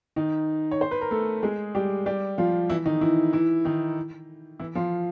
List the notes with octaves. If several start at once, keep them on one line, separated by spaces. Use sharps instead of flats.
D#3 D#4
C#5
C5
B4
A#4
A3 A4
G#3 G#4
G3 G4
G3 G4
F3 F4
E3 E4
D#3 D#4
E3 E4
E3 E4
D#3 D#4
E3 E4
F3 F4